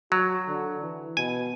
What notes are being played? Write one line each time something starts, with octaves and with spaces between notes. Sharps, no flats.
F#3 F#4
D3
E3
B2 G#5